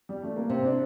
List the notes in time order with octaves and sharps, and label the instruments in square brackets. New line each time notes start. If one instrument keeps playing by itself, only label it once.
[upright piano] G3
A3
A#3
[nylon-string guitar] C3 [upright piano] C4
[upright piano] D4